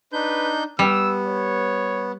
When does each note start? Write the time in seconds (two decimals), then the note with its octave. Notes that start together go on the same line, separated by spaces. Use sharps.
0.13 D4 D#4 B4 G6
0.79 G3 B3 E6
1.26 C#5